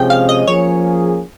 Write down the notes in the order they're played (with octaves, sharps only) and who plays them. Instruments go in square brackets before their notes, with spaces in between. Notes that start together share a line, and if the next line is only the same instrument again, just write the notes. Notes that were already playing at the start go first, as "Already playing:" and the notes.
Already playing: [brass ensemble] C3 F3 G#3 C#4 G#4 [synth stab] G5
[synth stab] F5
D#5
[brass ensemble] F3 A#3 C#4 G#4 [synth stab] C#5